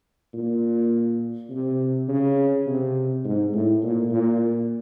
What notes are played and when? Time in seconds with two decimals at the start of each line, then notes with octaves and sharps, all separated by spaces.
0.34 A#2
1.50 C3
2.08 C#3
2.66 C3
3.25 G#2
3.54 A2
3.83 A#2
4.12 A#2